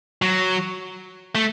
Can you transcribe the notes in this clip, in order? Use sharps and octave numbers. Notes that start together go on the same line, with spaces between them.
F#3
A3